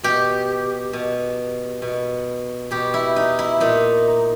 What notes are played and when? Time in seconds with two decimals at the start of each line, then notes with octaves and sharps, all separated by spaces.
0.03 B2 G4
0.93 B2
1.82 B2
2.71 B2 G4
2.94 E4
3.16 D#4
3.39 E4
3.60 A#2 D#4